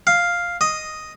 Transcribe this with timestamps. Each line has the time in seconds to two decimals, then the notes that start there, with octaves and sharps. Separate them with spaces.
0.07 F5
0.61 D#5